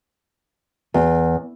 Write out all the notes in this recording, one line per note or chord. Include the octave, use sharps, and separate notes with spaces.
E2